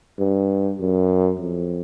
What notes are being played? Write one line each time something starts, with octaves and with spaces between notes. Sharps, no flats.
G2
F#2
F2